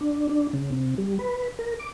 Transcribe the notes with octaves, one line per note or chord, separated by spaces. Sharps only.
D4
D4
C#3
C3
G3
B4
A#4
D6